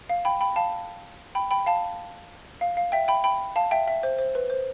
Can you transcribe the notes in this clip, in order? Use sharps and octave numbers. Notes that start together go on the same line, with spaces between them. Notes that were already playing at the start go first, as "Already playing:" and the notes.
F5
G5 B5
G5 B5
F5 A5
G5 B5
G5 B5
F5 A5
F5
F5
E5 G5
G5 B5
G5 B5
F5 A5
E5 G5
E5
C5
C5
B4
C5